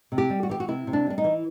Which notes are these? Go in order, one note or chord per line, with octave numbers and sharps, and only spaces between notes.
C3
G4
G3
F#4
E3 G4
F#4
C3 E4
C3
D4
G3 D4
D#4
E3